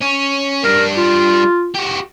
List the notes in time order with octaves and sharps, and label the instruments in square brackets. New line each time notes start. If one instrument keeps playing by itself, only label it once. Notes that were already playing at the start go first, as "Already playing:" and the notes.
[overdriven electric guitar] C#4
[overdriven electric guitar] G3 D4 [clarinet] A#4
[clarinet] F4
[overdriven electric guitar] F#4 G4